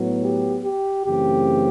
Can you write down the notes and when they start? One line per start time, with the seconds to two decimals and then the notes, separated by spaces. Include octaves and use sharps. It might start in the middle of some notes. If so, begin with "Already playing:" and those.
Already playing: A2 F#3 B3
0.24 G4
0.65 G4
1.06 F#2 C#3 E3 A3 C4 G4